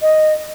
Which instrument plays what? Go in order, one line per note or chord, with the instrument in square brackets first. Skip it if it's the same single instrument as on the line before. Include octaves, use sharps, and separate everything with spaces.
[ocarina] D#5